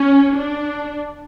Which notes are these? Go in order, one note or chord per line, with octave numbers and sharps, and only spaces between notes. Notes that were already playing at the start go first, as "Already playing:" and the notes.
Already playing: C#4
D4